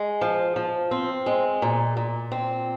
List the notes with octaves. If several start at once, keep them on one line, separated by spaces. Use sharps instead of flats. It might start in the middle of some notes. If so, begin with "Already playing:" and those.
Already playing: G#3
F3
F3
C4
G#3
A#2
A#2
C4